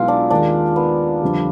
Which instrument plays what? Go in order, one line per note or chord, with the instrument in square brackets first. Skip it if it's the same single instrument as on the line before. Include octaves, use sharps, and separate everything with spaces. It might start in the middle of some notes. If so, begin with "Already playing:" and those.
Already playing: [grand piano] B1 B2 G#3 B3 E4 [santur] F4
[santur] D4
[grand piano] D#2 D#3 G#3 [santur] D4
[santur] B3
[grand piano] F2 D3 G3